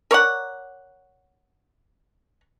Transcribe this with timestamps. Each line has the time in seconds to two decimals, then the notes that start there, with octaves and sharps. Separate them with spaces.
0.11 A#4 C#5 D5 F#5